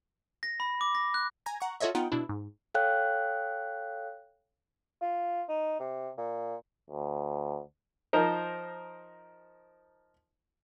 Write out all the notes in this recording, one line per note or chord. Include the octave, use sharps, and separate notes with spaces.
A#6
B5
D6
A#6
F#6
G#5 A#5 G#6 A#6
F#5 A#5 C#6
F4 F#4 A4 C#5 D#5 E5
B3 D#4 F4 F#5 G5
B2 D4 E4
G#2
A4 C#5 F5 G5 F#6
F4
D#4
C3
A#2
D2
F3 D#4 A#4 C5